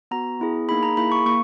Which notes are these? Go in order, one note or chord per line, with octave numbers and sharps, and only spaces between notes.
B3 F#4 A#5
B3 E4 G#4
A#3 D#4 G#4 B5
A#5
A#3 E4 G#4 B5
C#6
A#3 C#6